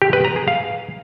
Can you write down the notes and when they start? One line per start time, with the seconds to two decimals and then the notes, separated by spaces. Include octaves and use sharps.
0.02 G4
0.13 B4
0.25 A#5
0.36 G#4
0.48 F5